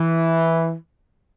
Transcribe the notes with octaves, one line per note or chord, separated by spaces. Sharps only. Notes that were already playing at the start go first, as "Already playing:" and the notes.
Already playing: E3